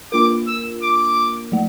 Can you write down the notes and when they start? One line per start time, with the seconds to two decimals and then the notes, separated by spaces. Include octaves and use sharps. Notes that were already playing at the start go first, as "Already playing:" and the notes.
0.12 A#3 D4 F4 A#4 D6
0.47 E6
0.83 D6
1.52 F3 A3